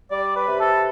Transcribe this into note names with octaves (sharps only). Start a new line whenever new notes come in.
G3 D5
B4
C3
A4